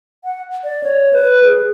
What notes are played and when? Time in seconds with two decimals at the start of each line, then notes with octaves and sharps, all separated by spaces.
0.24 F#5
0.64 D5
0.83 C#5
1.13 B4
1.43 G#4